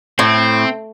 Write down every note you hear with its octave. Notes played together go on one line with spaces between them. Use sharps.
A2 C4